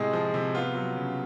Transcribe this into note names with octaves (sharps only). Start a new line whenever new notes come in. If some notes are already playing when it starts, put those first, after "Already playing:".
Already playing: A2 C3 G#3 G#4
F3
C3
B3 F4
F#3
C#3